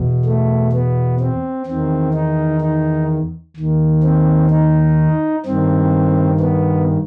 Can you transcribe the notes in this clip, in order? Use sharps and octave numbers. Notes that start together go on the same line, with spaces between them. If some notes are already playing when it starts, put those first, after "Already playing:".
Already playing: E2 B2
A3
B3
C4
E2 D#3 C4
D#4
D#4
D#2 D#3
C4
D#4
G2 D#3 C4
B3